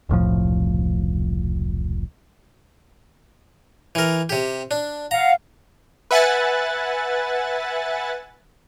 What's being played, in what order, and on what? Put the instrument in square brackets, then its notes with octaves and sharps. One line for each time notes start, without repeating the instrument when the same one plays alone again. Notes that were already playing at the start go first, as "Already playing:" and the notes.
[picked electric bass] E1 C2 A2 F3
[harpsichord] E3 A#4
C3 G4
D4
[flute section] F5 F#5 [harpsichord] A#5
[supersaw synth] B4 E5 F#5 G#5 F#6 A6